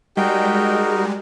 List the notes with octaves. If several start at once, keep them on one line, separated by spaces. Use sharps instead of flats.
G3 G#3 D#4 F#4 G4 A#4